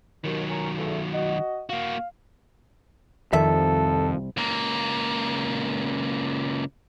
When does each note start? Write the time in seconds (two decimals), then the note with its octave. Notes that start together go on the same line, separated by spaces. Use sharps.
0.24 D#2 D#3 F#3
0.50 C#4 A#4 C#6
0.76 E2 C#3 A3
1.13 F#4 D#5
1.70 A#3 F#4 F5
3.33 C2 F2 D#3 A4 E5
4.37 C#2 A#3